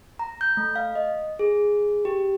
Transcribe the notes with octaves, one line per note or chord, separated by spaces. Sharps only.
A#5
G6
A3
F5
D#5
G#4
G4